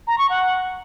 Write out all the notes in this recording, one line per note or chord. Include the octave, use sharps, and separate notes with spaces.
A#5
C#6
F#5